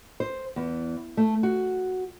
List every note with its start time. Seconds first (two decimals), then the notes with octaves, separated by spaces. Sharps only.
0.20 C5
0.56 E2
1.17 A3
1.43 F#4